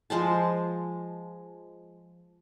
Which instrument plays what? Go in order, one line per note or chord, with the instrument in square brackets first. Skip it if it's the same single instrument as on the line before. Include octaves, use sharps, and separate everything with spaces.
[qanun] F3 G#3 C5 A5